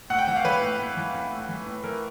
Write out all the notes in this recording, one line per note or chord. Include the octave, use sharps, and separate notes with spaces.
A2 F#5
G5
E3 F#5
F5
E3 B4
A2
A2
E3
E3
A2
E3
A2
E3 A#4